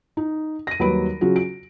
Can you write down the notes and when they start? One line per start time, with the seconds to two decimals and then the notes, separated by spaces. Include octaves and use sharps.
0.17 D#4
0.67 A#6 D#7
0.79 D#2 F#3 G3 B4 B5 D7
1.21 C#3 F#3 F4 F#4 G#4
1.36 D7